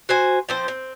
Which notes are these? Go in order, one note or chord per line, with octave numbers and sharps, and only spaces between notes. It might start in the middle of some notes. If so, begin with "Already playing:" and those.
F#4 C5 G#5
F3 C4 C5
C4